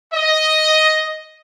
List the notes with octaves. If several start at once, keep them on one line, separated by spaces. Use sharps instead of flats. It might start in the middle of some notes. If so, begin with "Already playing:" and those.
D#5